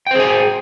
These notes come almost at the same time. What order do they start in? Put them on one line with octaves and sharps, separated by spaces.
G5 C5 G#4 G#5